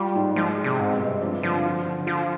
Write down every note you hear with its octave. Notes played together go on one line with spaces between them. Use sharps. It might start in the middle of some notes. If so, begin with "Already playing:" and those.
Already playing: G3 F4
G#2
F3 G#3
G#3
C3
G#2 C4
B2
G2
C3
F3 D4
D3 F3
F4
D3
F3 F4